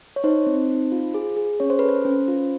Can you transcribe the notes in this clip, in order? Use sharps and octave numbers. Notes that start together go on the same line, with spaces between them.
C#5
D#4 C5
C4
D#4
F4
G#4
G#4
C#4 C#5
C5
A4 B4
C5
C#4
F4